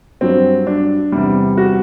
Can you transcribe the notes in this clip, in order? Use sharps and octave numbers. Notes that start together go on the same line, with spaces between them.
G2 F#3 C4
D4
E2 C3 G3
F#4